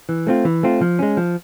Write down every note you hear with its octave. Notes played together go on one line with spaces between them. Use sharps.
E3
A3 C4 F4
E3
A3 C4 F4
F3
G#3 C#4
F3